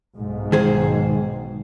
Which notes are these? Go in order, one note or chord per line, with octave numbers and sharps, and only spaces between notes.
B1 G#2
D#3 G#4 C5